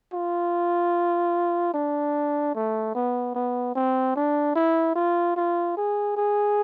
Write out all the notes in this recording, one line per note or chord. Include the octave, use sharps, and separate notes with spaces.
F4
D4
A3
B3
B3
C4
D4
E4
F4
F4
G#4
G#4